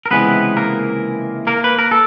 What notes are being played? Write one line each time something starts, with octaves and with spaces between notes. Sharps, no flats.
A#4
C#2 C3 E3 G#3 B3 B4
A#3 A#4
A#3 A#4
B4
A#4
A4